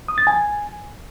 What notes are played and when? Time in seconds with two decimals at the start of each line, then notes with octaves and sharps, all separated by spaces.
0.08 D#6
0.18 A6
0.27 G#5